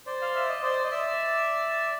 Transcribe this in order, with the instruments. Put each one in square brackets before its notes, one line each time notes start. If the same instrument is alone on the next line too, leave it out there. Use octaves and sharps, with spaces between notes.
[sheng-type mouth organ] C5 D5
F5
E5
D#5
C5 D5
D#5
D5 E5